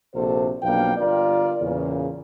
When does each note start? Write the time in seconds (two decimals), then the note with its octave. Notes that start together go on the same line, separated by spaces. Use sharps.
0.15 A#1 C3 A#3 F#4 A4 C5
0.63 B1 F2 A#3 D4 F5 G5
0.97 G1 F4 A#4 D5
1.61 E2 A#2 C#3